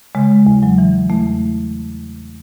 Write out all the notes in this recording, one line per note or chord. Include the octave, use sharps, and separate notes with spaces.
C#3 G#3
E2
F#3
E3
E2 A3